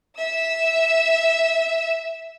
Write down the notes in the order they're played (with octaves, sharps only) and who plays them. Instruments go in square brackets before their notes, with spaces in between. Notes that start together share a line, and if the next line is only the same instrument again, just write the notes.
[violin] E5 E6